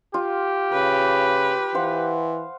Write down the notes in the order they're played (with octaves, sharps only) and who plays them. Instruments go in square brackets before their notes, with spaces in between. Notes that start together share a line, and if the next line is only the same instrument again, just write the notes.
[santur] F4 [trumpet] G4
[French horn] C#3 [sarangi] B4
[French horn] E3 [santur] C5 F5 F#5